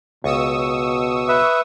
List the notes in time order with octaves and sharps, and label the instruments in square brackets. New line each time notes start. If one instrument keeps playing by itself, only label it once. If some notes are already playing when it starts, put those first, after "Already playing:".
[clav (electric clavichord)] C#2 [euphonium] B2 [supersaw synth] C#6 D#6 E6
[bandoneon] B4 E5